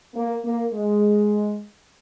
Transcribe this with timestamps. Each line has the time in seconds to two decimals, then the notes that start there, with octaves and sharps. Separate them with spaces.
0.14 A#3
0.44 A#3
0.73 G#3